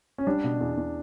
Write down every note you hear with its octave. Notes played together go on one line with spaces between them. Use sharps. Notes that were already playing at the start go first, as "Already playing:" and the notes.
C#4
G3 D4
B2
E2
E2